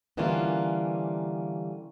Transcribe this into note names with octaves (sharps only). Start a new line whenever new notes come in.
D3 E3 G3 A#3 C#4 F4